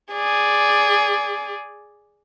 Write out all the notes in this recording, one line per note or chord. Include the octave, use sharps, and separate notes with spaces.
G#4 D5